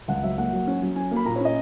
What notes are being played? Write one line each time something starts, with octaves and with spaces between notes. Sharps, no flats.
C#2 F#5
F#3 E5
A#3 F#5
F#3
C#4
F#3
C#4 G#5
A#3
B5
A#2 A#5
C#5
C#4 D#5